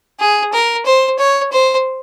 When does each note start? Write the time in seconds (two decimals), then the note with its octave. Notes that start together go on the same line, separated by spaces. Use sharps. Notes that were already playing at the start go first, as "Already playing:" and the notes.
0.20 G#4
0.53 A#4
0.86 C5
1.19 C#5
1.52 C5